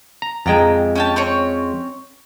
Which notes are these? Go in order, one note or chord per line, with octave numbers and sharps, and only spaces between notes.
A#5
F2 G#3 G5 A#5
C#4 G4 A5
C4 C#4 C#5